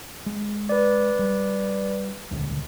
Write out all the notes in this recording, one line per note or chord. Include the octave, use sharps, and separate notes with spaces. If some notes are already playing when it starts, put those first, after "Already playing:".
G#3
B4 D5
G3
D#1 C#2 D3